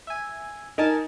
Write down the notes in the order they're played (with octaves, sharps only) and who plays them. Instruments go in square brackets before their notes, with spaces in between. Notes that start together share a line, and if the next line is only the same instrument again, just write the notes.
[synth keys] E5 G#5
[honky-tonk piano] D#4 [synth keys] A#4 G#5 A5